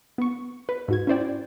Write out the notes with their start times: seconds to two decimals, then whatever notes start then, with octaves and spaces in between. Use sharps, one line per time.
0.18 B3 C#6
0.69 B4
0.88 G#2 F#4 G#6
1.07 C#4 E4 C5 D5 G5